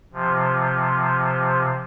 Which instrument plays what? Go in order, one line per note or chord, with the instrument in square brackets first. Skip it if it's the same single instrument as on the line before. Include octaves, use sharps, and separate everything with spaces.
[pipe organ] C3 F3